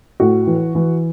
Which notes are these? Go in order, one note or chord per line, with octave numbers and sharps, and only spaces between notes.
A2 F#4
E3
E3